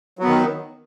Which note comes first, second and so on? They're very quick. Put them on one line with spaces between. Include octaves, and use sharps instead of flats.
F#3 B3 D#3